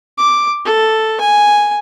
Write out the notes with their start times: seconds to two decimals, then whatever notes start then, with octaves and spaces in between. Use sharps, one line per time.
0.18 D6
0.65 A4
1.20 G#5